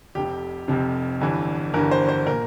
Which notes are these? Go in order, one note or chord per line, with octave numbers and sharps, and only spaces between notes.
F1 F2 C3 G4
F1 F2 C3
G1 G2 E3
G1 G2 E3 A#4
C5
C5
A#2 A#4